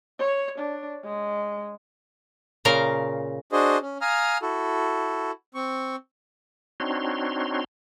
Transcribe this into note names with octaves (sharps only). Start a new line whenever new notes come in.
C#5
D4
G#3
A#2 C#3 A#4 F5 A#5
D4 F#4 G#4 C5 D#5
C#4
F5 G#5 A#5 D#6 F6
E4 F#4 A4
C4 C#6
C4 D4 D#4 F#4 C#5 C6